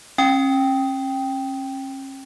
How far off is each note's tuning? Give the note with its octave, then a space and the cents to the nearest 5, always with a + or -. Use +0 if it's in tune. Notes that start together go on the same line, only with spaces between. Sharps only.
C#4 -40 G5 +0